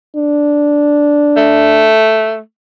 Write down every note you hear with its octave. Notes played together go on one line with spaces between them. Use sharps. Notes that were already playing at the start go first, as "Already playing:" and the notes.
D4
A3